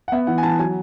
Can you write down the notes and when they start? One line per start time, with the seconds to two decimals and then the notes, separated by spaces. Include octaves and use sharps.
0.08 F#5
0.12 B3 E5
0.27 E3 F#5
0.38 G#5
0.43 E3 A5
0.59 F#3 G#5